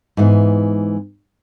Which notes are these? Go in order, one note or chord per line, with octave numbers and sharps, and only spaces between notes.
G#2 E3 B3